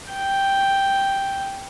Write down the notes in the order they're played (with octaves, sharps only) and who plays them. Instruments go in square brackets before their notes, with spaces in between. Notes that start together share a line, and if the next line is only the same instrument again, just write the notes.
[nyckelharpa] G5